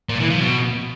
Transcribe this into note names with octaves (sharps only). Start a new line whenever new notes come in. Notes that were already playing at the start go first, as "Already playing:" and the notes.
A#2
E3
F3
B2